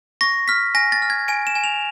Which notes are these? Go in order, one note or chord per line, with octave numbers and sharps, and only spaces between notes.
C#6 A#6
F6 B6
G#5 A#6
A6
F6
G#6
G#5 D7
E7
G#5
F7